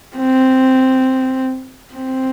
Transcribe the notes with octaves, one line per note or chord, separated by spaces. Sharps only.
C4
C4